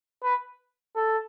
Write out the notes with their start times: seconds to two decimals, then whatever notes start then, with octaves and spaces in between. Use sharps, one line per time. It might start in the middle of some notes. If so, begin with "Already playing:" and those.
0.23 B4
0.96 A4